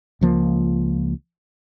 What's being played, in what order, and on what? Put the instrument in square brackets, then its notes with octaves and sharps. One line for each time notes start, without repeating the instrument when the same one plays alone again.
[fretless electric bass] C#2 F3 A#3